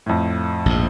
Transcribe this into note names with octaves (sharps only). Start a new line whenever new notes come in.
F2 A2
A#1 G#2